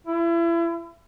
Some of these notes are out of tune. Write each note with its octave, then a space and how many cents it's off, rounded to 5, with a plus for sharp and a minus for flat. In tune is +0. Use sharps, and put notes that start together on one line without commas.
E4 +35